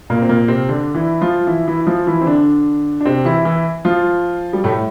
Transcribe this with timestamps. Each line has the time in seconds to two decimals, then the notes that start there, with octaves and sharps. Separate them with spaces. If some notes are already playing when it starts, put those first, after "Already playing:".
0.10 A#2 A#3
0.22 C4
0.29 A#2 A#3
0.48 C3 C4
0.69 D3 D4
0.94 E3 E4
1.21 F3 F4
1.47 E3 E4
1.68 E3 E4
1.81 E4
1.87 F3 F4
2.07 E3 E4
2.21 C4
2.26 D3 D4
3.01 D4
3.05 C3 C4
3.25 E3 E4
3.45 E3 E4
3.85 F3 F4
4.53 G3
4.64 A2 A3